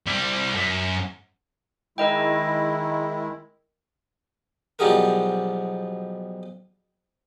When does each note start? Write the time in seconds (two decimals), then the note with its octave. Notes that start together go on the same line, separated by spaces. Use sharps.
0.07 G3 E4
0.53 F#2
1.98 D#3 G#3 E4 A#4 D#5 G5
4.79 B1 F3 G3 F#4 G#4 A#4